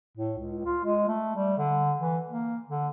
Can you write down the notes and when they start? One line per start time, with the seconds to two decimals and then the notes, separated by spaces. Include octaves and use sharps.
0.17 A2
0.38 C#2
0.65 F4
0.85 G#3
1.08 A3
1.36 G3
1.58 D3
1.99 E3
2.29 A#3
2.69 D3